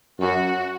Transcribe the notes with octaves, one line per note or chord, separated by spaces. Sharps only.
F#2 F#4